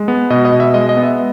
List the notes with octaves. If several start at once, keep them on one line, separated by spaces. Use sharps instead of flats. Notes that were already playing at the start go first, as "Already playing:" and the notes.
Already playing: G#3
B3
B2 D#5
D#5
B2
E5
G#3 D#5
D#5
B3
E5